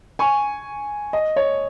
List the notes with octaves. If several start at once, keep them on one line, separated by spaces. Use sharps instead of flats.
G#5 C#6
D#5
C#5